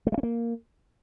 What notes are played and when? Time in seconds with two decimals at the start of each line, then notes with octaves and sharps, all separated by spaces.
0.07 A3
0.12 G#3
0.18 C#4
0.23 A#3